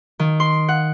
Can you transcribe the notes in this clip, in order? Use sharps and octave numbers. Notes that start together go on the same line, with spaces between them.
D#3
C6
F#5